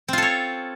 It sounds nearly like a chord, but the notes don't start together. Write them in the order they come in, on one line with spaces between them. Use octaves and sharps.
C4 F4 A4 C#5